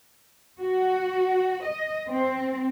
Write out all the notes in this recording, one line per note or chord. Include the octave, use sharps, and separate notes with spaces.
F#4
D#5
C4